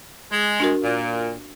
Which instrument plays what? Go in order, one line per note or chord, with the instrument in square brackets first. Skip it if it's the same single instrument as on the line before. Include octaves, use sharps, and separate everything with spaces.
[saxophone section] G#3
[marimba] D4 F#4 A#4
[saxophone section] A#2